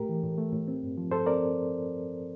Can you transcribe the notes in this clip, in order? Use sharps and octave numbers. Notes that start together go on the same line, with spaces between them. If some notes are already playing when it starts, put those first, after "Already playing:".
Already playing: A2 A3 G4 A#4
E3
A2
A3
A2
C4
G2
F3
G2 A4 C5
C4 A#4 D5